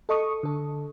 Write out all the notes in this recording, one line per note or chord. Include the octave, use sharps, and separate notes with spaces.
A4 D#5 C#6 D#6
D3 A4